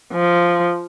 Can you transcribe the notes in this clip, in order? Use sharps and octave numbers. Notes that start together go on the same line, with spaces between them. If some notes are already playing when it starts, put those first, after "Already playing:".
F3